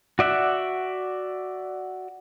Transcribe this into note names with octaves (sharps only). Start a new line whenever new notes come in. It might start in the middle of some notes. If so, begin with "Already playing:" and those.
F#4 D5 E5 F#5